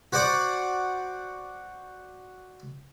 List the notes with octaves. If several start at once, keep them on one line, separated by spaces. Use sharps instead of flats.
F#4 C5 D5 F#5 D6